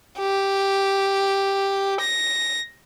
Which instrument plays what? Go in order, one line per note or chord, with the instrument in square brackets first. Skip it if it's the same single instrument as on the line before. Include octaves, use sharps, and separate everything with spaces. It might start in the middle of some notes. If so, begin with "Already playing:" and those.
[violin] G4
A#6